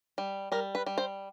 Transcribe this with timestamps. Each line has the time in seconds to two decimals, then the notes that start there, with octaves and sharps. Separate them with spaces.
0.18 G3
0.52 G3 A#4
0.75 B4
0.86 G3
0.98 C5